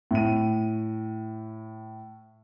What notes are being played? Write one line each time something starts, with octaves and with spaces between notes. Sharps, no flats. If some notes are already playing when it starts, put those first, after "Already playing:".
A2 D#7